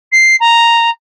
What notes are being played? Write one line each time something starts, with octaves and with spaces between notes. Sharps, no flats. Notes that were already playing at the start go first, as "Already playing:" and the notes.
C7
A#5